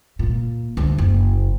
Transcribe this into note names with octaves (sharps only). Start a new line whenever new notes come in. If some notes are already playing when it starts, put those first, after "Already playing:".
A#2
D2 D4
F#1